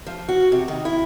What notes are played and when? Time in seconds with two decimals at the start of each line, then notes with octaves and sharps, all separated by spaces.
0.07 F3
0.28 F#4
0.52 C3
0.68 D#3
0.85 E4